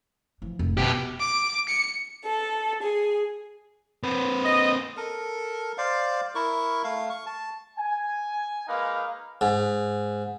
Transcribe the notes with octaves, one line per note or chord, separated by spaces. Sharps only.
E3 F3
F1 A2
B1 B2 G4
D6
C#7
A4
G#4
C4 B4
D#5
A4 A#4
C5 D5 F5
E4 A#4 C#6
A3 F5
C#6
A5
G#5
G#3 A#3 D#4 B4 F5
G#2